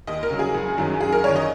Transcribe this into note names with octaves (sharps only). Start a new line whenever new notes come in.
D#2 D#5
A#4
C#3 F#3
G#4
F#1
F#2 D#3 F#3
F#1 G#4
A#4
F#2 D#3 C#5
D#5